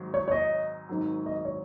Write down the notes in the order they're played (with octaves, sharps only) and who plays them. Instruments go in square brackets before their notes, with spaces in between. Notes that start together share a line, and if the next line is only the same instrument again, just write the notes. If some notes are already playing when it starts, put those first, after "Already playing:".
Already playing: [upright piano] G#1 G#2 F#3
[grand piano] C#5
C#5
D#5
[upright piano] G#1 G#2 D#3 F#3
[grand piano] D#5
C#5